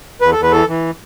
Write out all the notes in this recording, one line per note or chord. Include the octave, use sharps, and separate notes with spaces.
E2 B4
A4
E2
B4
E3 A4
E3